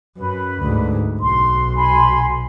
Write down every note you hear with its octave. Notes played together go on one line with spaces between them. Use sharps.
F#2 B4
D2 G#2
B1 C6
G#5 B5 C6